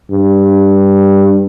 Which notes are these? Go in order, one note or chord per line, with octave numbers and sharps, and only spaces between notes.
G2